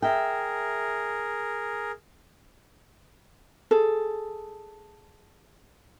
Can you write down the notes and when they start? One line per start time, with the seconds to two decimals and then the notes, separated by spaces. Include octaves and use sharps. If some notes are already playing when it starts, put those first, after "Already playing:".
0.02 G#4 A#4 E5 G5
3.71 G#4 A4